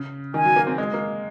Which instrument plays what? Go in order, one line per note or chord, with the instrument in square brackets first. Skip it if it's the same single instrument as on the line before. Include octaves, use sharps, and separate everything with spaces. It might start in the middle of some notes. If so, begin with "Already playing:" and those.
Already playing: [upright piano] C#3
[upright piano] D#3 [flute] G#5
[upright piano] F#3
A#3
C4
G#3
A#3